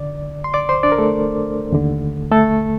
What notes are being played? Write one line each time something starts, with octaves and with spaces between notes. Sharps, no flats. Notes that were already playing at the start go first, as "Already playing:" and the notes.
Already playing: D3 D5
C6
D5 D6
C5 C6
D4 D5
A#4
A3 A4
D#2 D3
A3 A4